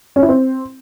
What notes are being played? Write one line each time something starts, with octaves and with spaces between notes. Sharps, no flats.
C#4
E4
C4